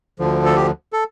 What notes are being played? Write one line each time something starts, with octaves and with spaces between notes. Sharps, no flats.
D2 D3 F3
A4
G4
A4